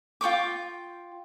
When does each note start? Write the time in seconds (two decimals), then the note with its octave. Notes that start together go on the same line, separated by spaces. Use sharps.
0.21 F4 G5 C#6 D6